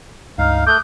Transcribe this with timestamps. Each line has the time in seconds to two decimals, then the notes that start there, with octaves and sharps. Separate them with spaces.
0.38 C#2 G2 D#4 F5 F6
0.67 A3 D6 D#6 F#6 G6